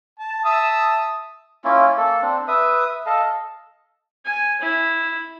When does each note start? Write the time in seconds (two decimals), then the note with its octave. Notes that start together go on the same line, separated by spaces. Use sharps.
0.19 A5
0.45 E5 A5 D#6
1.65 A#3 C#4 E4 F4
1.98 A#3 A4
2.21 C4 D4
2.48 B4 E5 D#6
3.06 A4 D#5 F5 A5
4.25 G#5
4.61 E4